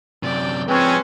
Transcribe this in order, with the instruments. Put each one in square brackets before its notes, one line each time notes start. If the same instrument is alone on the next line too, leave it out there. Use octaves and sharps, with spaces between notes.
[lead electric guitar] F#2 C3 [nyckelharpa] D5 G5
[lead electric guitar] F3 G#3 [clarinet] C4 [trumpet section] C#4 [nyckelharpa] B4 C5